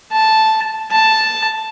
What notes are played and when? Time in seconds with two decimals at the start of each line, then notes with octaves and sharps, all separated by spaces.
0.12 A5
0.91 A5